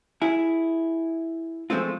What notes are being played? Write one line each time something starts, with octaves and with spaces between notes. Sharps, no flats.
E4 G#4
F3 G#3 A3 C4 F4